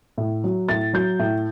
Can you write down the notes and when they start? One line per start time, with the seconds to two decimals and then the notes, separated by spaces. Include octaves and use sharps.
0.18 A2
0.44 F#3
0.69 A2 A6
0.93 F#3 G6
1.19 A2